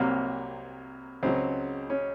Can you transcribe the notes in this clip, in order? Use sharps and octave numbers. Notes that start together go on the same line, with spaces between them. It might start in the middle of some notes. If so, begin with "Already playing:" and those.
Already playing: C2 C3 F#3 A#3
C#2 C#3 F#3 C4
C#4